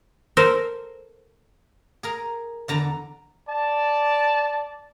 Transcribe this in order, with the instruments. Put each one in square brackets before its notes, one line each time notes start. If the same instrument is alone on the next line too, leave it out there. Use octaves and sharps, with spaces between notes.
[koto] A4 A#4 C5
[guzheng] G#4 A#4 A#5
E2 D3 A#5
[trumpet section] D5 A5